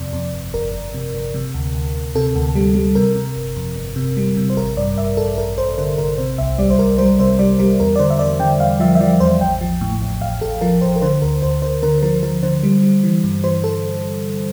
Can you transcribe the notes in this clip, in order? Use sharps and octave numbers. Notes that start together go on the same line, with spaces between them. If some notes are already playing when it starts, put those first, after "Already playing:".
Already playing: F2 C3 D5
F2
G1
G1 A#4
G1
C3
G1
C3
D2
D2
D2
C3 A4
D2
G3
G3
C3 A#4
C3
G1
F2
G1
C3
G3
C3
C5
A1 A#4
G2 D5
A1 E5
A1 A4
A1 A#4
A1 C5
D3 C5
A1 A#4
C3 C5
C2 E5
G3 D5
C5
C2 A#4
G3 C5
C3 C5
G3 D5
G3 A#4
E2 A#4
D5
D3 C5
E5
E2 D5
D3 G5
E2 F5
F3 E5
E5
F3 D5
E2 C5
A1 G5
F3
A2
A1
A1 F5
A1 A4
F3 A#4
A1 C5
A#4
D3 C5
D2 A#4
D2 C5
D3 C5
D3 A#4
F3 A#4
F3 A#4
D3 C5
G3
G3
E3
G2
E3 C5
A4